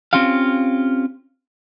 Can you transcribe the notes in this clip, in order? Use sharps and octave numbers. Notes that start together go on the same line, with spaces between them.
C4 C#4 F4 G4 F5